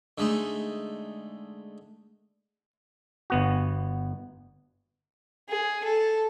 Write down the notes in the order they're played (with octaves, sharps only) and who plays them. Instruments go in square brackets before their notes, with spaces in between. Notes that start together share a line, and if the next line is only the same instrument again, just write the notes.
[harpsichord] D3 G#3 A3 D#4
[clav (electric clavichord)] G1 B3 F#4
[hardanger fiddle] G#4
A4